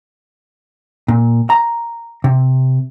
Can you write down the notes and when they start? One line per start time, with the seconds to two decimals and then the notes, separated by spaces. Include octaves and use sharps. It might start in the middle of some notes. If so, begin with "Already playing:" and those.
1.08 A#2
1.50 A#5
2.24 C3